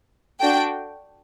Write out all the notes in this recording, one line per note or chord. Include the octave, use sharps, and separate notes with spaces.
D4 F#4 A4 G5